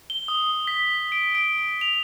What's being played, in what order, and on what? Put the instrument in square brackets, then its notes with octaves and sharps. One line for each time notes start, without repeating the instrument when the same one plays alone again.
[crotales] G7
D#6
B6
D7
D7
F7